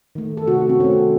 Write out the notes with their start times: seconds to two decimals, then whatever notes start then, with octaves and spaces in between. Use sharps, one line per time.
0.15 D#3 A3
0.37 A4
0.47 C3 F#4
0.69 C4
0.80 D#3 A3 C#4